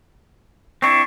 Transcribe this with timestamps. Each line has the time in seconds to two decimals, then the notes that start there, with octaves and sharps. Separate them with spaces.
0.82 C4 D4 E4 C#6